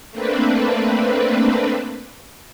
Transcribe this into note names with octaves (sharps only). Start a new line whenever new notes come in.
A3 A#3 C4 D4 B4